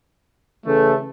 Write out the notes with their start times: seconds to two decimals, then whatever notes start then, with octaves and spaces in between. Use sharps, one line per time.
0.66 C#3 E3 A3